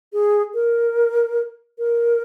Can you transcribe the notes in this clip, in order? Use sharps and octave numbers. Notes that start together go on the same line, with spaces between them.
G#4
A#4
A#4